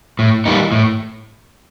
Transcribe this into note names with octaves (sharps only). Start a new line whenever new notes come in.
A2
E3 G3 A#3 D#4
A2